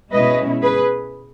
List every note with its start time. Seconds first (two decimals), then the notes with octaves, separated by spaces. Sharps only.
0.12 B2 G#3 C#4 E4 B4 D#5
0.62 G#4 B4